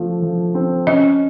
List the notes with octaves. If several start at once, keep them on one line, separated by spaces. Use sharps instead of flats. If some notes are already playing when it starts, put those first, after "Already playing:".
Already playing: F3 A3
F3
C4
C#4 D#5